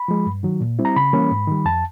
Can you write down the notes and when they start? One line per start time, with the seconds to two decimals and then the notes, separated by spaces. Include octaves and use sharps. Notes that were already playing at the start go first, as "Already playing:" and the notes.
Already playing: B5
0.08 F3 G#3
0.26 G2
0.43 D#3 F#3
0.61 A#2
0.79 G3 C4 E4
0.85 A#5
0.96 C#3 B5
1.13 E3 G3 A#3 C#4
1.31 G#2
1.48 D#3 G3
1.65 F2 A5